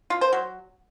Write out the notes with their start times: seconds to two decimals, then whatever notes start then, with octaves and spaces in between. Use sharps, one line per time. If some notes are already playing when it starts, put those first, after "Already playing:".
0.10 F4
0.21 C5
0.33 F#3